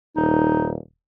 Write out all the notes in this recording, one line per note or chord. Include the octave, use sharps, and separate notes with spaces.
D#1 D#4